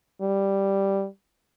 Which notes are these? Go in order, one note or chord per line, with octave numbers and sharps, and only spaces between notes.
G3